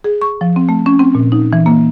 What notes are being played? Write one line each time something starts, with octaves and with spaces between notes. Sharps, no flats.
G#4
C#6
F3
C4
A3
C#4
C4
A#2
D#4
E3
A#3